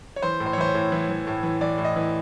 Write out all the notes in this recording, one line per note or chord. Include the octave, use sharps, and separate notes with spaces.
C#5
E3 C5
A2
C5
C#5
E3 C5
C#5
A2
E3
E3
A2
E3
E3 D5
A2
D#5
E3